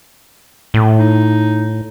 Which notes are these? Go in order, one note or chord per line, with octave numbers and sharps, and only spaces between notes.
A2
D#4